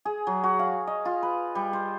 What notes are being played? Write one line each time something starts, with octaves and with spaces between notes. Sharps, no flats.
G#4
F#3
F#4
F5
D#5
F4
B4
G3
C5